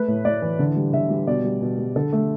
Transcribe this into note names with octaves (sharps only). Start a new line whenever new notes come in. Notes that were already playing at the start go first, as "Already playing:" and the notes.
Already playing: A3 B4
A2
A2 D5
E3
D3
G3
D3 E5
G3
B2 D5
G3
B2
G3
D3 A4
A3